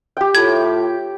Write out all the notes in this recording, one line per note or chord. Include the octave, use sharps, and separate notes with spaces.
G4 G5
A2 F4 G#6